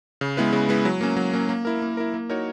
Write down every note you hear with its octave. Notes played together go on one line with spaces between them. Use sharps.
C#3
G#3 B3 E4 B4
C#3
G#3 B3 E4 B4
F#3
A#3 C#4
F#3
A#3 C#4
A#3
E4 A#4
A#3
E4 A#4
A#3
D#4 F#4 A#4 C#5